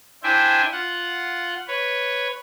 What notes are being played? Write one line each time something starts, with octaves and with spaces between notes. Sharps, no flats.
D4 E4 C5 E5 G5 G#5
F4 F#5
B4 C#5